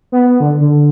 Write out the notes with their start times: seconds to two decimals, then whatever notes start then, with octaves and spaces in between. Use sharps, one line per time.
0.12 B3
0.40 D3
0.60 D3